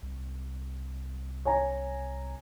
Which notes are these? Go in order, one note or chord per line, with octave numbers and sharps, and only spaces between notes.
C2
C#5 G#5 A#5